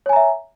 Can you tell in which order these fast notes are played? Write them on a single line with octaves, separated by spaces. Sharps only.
C#5 G#5 A#5 E5